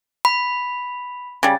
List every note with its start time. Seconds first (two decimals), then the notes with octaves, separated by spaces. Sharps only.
0.25 B5
1.43 C#3 G3